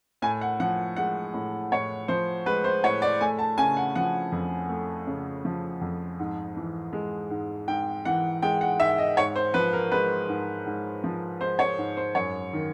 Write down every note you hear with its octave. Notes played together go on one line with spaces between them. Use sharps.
A2 G#5
F#5
F3 F#5
G#3 F#5
A2
A2 C#5
F3 C5
G#3 B4
C5
A2 C#5
D5
A3 G#5
A5
C#3 G#5
F#5
F3 F#5
F2
A3
C#3
F3
F2
G#2
E3
G#3
G#2
G#2 G5
E3 F#5
G#3 G5
F#5
G#2 E5
D#5
G#2 C#5
C5
F3 B4
A#4
G#3 B4
G#2
G#2
F3
G#3 C5
C#5
G#2
C5
F#2 C#5
D#3